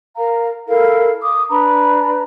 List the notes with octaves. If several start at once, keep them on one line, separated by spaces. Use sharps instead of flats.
A#4 F5 A#5
E4 A4 A#4 F5
D6 D#6
D4 B4 A#5 B5